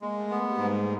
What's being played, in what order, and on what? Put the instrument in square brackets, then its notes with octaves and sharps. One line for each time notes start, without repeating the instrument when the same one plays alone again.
[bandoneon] G#3 [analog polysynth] A#3
[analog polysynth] A3
[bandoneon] B3
[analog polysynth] A3
G3
[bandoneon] G#2 [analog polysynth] G#3